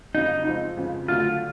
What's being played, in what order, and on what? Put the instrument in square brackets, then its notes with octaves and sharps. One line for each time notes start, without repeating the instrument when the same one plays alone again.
[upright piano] F2 C#3 F#3 [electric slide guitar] D#4
[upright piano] F3 G#3 C4
F2 C#3 F3 G#3
[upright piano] D3 F#3 A3 D4 [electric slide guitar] F4